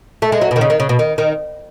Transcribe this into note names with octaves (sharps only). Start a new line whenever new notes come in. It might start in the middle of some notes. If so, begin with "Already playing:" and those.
A3
G#3
F#3
B2
D#3
C#3
D#3
C#3
B2
D#3
D#3